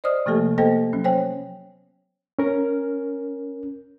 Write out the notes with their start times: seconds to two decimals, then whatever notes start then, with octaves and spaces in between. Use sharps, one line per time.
0.04 C5 D5 D#5 D#6 F6
0.26 C3 F3 A3 A#3 G4 A4
0.58 A#3 B3 A4 C5 D#5 G5
0.93 F#3 C#4
1.04 C5 C#5 G5 G#5
2.39 C#4 A#4